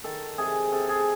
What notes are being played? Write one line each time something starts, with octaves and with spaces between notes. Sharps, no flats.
D#3 A4
C3 G#4
C3 A4
G#4